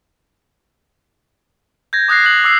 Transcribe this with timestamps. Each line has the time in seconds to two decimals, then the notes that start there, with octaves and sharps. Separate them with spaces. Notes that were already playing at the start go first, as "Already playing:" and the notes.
1.93 G6 G#6 A#6
2.08 D6 D#6 F#6 A#6 C7
2.25 F#6 F#7
2.44 D6 E6 C7